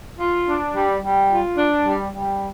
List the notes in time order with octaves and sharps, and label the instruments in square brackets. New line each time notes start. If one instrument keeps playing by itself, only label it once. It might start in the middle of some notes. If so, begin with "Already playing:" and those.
[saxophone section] F4
D4
G3
G3
F4
D4
G3
G3